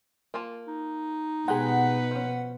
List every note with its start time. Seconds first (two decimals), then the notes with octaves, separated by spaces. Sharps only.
0.34 A#3 F4 A5
0.68 D#4
1.48 B2 G#3 G4 G#4 B4 F#5
2.11 F3 C#4